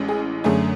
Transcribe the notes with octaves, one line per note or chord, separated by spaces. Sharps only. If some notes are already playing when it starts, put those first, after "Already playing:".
Already playing: A1 A2 E3 G#3 C#4
G#4
F#2 D3 A3 G#4